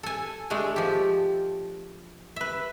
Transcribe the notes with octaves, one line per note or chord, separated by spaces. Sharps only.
A4 G#5
G#3 A3 D4 G#4
F3 G4
B4 E5